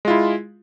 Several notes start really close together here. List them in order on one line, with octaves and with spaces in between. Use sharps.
G#3 F4 E4